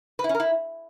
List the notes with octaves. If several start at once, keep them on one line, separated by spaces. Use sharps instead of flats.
B4
E4
C#4
A#4
E4